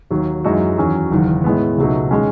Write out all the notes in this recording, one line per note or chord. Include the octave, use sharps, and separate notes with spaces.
D#2 D#3 F#3
F#2 E3 G#3 D#4 F#4
E2 D#3 F#3 C#4
F#1 E2 D#3
A2 G#3 B3
C#2 B2 F#3 A3 D#4
D#3 G#3 C#4